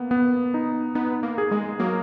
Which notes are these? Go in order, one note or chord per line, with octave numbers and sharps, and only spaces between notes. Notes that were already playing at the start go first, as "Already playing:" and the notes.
Already playing: A#3 B3
B3
D#4
B3 D#4
A#3
G#4
G#3
F#3 A#3